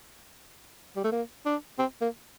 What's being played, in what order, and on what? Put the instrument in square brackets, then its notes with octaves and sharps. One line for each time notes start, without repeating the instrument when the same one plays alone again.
[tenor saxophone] G3
A3
A#3
D4
C4
A#3